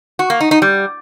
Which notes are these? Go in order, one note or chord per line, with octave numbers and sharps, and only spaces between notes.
F#4
A#3
D#4
D#4
G3